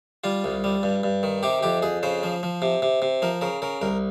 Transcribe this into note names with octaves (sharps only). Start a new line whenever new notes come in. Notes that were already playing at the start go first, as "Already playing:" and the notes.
G3 F4
C2
G3
G2
G2
D#3
C3 G4
F2 G4
F2 G#4
C#3 C5
F3
F3
C3
C3
C3
F3 A#4
C#3 A#4
C#3 A#4
C2 A#4